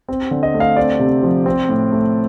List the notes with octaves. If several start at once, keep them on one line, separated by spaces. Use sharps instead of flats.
C4
D3
D#5
A3
F5
C4 D5
C3
F3
C4
A2
A3